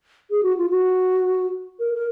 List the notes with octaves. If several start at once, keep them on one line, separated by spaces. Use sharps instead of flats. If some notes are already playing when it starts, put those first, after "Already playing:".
G#4
F#4
F4
F#4
A#4
A#4